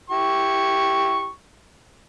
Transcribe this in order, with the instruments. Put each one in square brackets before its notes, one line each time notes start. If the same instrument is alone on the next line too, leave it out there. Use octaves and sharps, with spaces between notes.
[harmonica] E4 G4 C#6